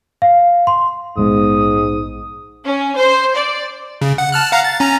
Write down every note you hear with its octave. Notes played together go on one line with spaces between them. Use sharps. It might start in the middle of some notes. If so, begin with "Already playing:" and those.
F5
C6
A#1 G#2 G#3 B3 D#6
C#4
C5
D5
C#3
F#5
A5 F6 F#6
F5 F#5 A#5
A6
C#4 A#5